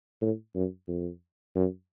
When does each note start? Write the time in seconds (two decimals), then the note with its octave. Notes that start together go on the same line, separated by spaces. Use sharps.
0.22 A2
0.55 F#2
0.88 F2
1.56 F#2